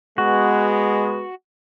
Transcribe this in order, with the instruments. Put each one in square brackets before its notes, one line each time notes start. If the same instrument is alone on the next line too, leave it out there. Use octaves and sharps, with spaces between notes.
[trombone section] G#3 B3 [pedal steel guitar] F#4